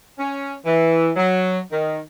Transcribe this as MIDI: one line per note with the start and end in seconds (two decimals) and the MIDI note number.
0.19 0.54 61
0.66 1.11 52
1.16 1.59 54
1.72 1.99 51